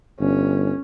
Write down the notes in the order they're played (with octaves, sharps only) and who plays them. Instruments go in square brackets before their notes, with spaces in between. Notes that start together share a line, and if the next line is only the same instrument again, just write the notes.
[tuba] G1 [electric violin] C#4